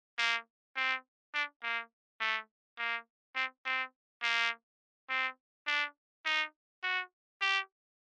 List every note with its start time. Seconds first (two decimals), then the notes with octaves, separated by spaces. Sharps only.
0.19 A#3
0.77 C4
1.34 D4
1.63 A#3
2.20 A3
2.79 A#3
3.36 C4
3.66 C4
4.23 A#3
5.10 C4
5.67 D4
6.26 D#4
6.83 F#4
7.42 G4